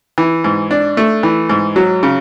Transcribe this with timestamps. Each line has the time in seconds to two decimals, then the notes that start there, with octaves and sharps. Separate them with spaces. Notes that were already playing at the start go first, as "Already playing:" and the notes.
0.18 E3
0.44 G#2
0.71 D4
0.97 A3
1.23 E3
1.49 G#2
1.76 F#3
2.03 C#3